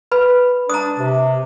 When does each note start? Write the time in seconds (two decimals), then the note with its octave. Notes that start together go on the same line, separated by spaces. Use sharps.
0.12 B4 B5
0.70 D4 A#5 D#6
0.98 C3